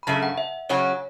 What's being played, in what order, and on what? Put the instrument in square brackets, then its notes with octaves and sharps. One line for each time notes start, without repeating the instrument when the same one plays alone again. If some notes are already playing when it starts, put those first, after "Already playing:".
[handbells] B5
[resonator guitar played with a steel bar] F#2 C#3 A3 [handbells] A5
[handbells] F#5
E5
[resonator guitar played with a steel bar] C#3 F#3 C#4 F#4 [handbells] C#5